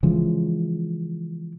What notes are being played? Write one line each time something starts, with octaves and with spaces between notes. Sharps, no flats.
C#3 E3 F3 G#3